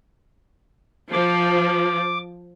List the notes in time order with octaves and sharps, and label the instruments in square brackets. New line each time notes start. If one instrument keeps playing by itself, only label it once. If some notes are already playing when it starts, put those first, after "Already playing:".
[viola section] F3 [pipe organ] D6